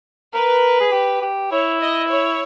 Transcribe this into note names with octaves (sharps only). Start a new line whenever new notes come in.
A#4 B4
G#4
G4
G4
E4 C#5
D#5
C#5